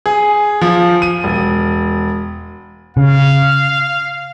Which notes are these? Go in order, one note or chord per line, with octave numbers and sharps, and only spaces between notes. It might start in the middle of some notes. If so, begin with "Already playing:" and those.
G#4
F3
D#7
E1
C#3 F5